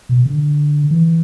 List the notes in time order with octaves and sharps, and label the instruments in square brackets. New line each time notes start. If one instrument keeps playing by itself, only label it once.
[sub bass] B2
D3
E3